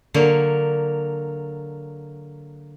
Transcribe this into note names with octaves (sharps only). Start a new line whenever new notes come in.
D3 F#3 A#3